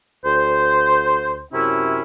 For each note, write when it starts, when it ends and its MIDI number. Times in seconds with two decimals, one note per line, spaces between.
0.24 1.42 38
0.24 1.42 72
1.53 2.03 42
1.53 2.03 48
1.53 2.03 61
1.53 2.03 64